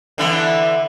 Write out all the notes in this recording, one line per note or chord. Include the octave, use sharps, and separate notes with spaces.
D3 E3 B3